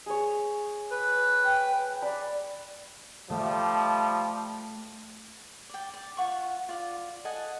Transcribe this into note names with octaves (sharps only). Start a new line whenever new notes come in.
G#4 C#5
B4
G5
D5 B5
F3 G3 A3
D5 G5
D5
F4 G#4 F#5 C#6
F4 D5
A4 D#5 F#5 G#5